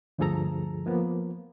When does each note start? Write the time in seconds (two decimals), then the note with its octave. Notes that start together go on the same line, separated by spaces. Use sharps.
0.18 D2 G2 F3 G#4 A4 A#5
0.86 F3 A#3 B3